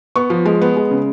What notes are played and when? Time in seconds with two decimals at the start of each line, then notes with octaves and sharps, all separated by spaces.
0.16 B3 C#6
0.30 F3
0.45 G#3
0.61 B3
0.77 G#3
0.91 C#3